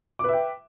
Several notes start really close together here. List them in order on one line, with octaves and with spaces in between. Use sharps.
D6 B4 E5 G5